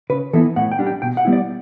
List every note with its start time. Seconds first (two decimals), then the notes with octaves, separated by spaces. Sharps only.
0.10 C#3 B4
0.33 E3 B3 E4 A4
0.56 A2 F#5
0.72 G5
0.79 G3 D4
0.87 G5
1.02 B2 G5
1.17 F#5
1.25 G3 B3 E4
1.33 D5